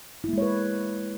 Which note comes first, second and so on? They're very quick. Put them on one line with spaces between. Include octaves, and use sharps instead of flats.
E4 A#3 G#3 C#5 B4